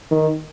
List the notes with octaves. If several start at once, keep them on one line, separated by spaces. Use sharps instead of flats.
D#3